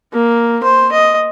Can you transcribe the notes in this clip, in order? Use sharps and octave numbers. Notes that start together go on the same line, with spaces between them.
A#3
C5
D#5